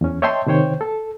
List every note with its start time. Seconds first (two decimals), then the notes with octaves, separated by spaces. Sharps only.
0.01 E2 C#4
0.22 C#5 D#5 E5 G5 A5 C6
0.47 C3 D#3 C5 C#5 G5
0.81 A4